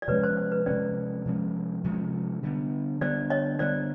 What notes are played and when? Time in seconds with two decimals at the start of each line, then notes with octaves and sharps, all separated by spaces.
0.02 D5
0.08 C3 F3 G#3 C#4 B4 C#5
0.23 C5
0.37 C5
0.52 B4
0.66 C3 F3 G#3 C#4 C5 D5
1.25 C3 F3 G#3 C#4
1.84 C3 F3 G#3 C#4
2.43 D3 G3 B3
3.01 D3 G3 B3 C5 D5
3.30 C#5 D#5
3.59 D3 G3 B3 C5 D5